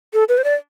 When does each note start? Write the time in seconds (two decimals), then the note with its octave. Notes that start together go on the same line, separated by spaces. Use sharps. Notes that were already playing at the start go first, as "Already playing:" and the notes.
0.14 A4
0.29 B4
0.38 C5
0.44 D5